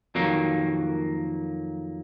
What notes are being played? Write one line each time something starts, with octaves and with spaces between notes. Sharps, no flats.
F2 D#3 F#3 A#3